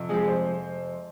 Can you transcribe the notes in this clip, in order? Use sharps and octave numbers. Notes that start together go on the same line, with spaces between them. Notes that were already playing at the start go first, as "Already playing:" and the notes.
Already playing: F2 C3
F3 G#3 C4 G4 G#4
C5